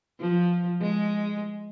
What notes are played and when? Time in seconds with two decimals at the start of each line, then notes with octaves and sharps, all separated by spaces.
0.20 F3
0.81 G#3